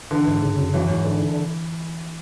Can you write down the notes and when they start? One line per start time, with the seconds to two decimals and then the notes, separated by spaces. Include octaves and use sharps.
0.11 D3 E3
0.27 G#2
0.42 C#3
0.58 F#2
0.74 E3 F#3
0.90 G#2
1.05 D3